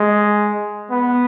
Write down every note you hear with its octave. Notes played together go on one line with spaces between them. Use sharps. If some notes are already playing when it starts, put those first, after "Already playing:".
Already playing: G#3
B3